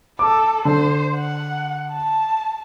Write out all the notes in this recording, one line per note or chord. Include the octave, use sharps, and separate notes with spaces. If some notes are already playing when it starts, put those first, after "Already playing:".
A4 D6
D3 C5
F#5
A5